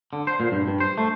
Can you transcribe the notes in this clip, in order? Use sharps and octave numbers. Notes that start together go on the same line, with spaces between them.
D3
C5
A#2
G2
G2
C5
A3